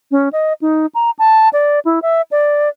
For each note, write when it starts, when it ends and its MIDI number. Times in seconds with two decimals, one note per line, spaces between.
0.11 0.29 61
0.33 0.53 75
0.61 0.86 63
0.95 1.11 82
1.19 1.49 81
1.53 1.79 74
1.85 1.99 64
2.02 2.22 76
2.31 2.69 74